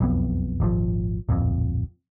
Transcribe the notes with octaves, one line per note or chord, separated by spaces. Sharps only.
E1 B1 F2 B3
D#1 G#1 A#2 F3
D1 A#1 F2